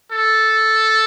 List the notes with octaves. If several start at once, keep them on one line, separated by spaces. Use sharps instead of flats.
A4